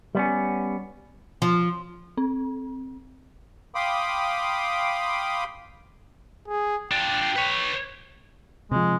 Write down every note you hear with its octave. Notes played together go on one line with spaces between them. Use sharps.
G3 B3 C#4
F3
C4
F5 G5 B5 C6 D6 D#6
G#4
D4 F4 G5
B4 C#5
C3 F3 G#3